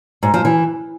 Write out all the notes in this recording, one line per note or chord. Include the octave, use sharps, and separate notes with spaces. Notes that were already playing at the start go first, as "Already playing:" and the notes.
G#2
F3
E3